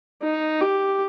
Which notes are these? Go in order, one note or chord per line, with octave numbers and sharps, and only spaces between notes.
D#4
G4